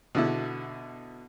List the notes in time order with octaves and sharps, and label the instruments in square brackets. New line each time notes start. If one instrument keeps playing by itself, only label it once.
[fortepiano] B2 D3 E4